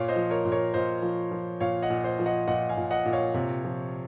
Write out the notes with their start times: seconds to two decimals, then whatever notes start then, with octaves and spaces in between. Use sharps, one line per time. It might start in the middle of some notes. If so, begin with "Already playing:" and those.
Already playing: A#2 C#5 F5
0.08 C5 D#5
0.16 F3
0.30 A#4 C#5
0.45 A#2
0.52 A#4 C#5
0.74 A#2 C5 D#5
1.02 F3
1.31 F3
1.60 A#2 C#5 F5
1.82 D#5 F#5
1.90 A#2
2.04 C5 D#5
2.19 F3
2.26 D#5 F#5
2.48 A#2 D#5 F#5
2.69 F5 G#5
2.77 A#2
2.91 D#5 F#5
3.05 A#2
3.13 C#5 F5
3.34 C3
3.64 F3